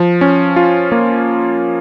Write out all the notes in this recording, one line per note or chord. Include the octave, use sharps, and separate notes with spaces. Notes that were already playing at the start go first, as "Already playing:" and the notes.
Already playing: F3
C#4
F4
A#3